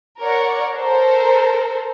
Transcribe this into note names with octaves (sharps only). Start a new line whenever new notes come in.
A#4 C#5 D5 F#5
A4 A#4 C5